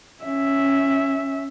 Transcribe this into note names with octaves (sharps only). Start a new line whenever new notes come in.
C#4 E5